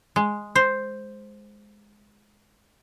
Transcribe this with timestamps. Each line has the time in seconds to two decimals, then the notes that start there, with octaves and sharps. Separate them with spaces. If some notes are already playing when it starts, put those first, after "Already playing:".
0.16 G#3
0.55 C5